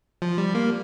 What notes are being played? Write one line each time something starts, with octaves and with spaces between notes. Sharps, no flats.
F3
G3
A#3